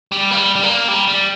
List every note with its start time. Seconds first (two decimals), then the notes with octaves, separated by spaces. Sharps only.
0.12 G3
0.31 A#3
0.37 G3
0.55 G3
0.63 A#3
0.88 G3
1.07 G3